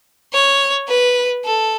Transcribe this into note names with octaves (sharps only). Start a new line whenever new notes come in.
C#5
B4
A4